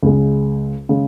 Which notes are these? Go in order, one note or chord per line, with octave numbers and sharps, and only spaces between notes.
C#2 C#3 G#3
C#3 G#3